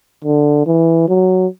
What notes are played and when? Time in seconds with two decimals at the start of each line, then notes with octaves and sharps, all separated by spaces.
0.24 D3
0.67 E3
1.09 F#3